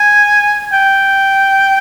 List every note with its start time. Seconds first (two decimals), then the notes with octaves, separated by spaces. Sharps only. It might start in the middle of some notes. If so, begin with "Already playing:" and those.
Already playing: G#5
0.73 G5